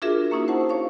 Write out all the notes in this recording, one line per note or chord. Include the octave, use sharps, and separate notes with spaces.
D4 F4 F#4 G#4 A#4 E5
A#3 C#4 D#4 E4 F#4
C5 F#5 A5
C#5 F5 C#6